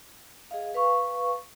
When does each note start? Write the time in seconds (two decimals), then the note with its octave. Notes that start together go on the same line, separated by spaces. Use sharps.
0.51 G#4 D#5 F5
0.74 B4 F5 C#6